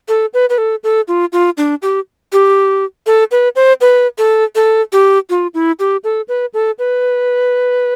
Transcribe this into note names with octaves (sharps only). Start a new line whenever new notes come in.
A4
B4
B4
A4
A4
F4
F4
D4
G4
G4
A4
B4
C5
B4
A4
A4
G4
F4
E4
G4
A4
B4
A4
B4